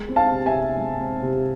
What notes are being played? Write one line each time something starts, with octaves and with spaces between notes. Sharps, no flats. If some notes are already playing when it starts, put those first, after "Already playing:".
Already playing: G#3
C4
F5 A5
C3
E5 G#5
C3
G#3
C4
C3